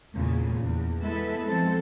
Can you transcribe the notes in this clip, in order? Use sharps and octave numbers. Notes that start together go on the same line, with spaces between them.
E2 A#2 C#3
E2
G#3 B3 E4 A4 B4 E5
F3 G#3 C4 A4